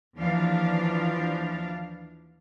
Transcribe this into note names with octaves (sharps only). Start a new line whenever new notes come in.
D#2 E3 F3 D4 F5